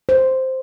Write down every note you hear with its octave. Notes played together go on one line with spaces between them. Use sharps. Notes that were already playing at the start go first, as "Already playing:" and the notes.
C5